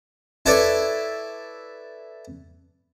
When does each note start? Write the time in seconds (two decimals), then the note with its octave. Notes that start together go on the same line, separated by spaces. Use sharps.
0.46 E4 A4 B4 C#5 D5